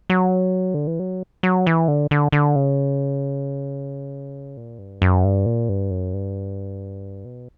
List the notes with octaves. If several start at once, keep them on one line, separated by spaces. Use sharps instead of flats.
F#3
D3
E3
F#3
F#3
E3
D3
D3
D3
C#3
A#2
G2
F#2
G2
A#2
G2
F#2
G2
B2